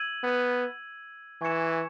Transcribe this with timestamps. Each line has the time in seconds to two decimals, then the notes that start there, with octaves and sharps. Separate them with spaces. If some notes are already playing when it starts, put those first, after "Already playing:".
Already playing: E6 G#6 D#7 F#7
0.24 B3
1.41 E3 G#5 C#6 G#6 C#7 E7